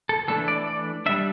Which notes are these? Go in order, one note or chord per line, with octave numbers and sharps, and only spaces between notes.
A4
E3 A3 D4 A4
D5
D5
G3 D4 E5